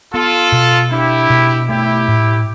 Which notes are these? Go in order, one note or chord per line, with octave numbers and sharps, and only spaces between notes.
B3 F4 A4
B2
D4 E4 G4
B2
A3 E4 G4
A2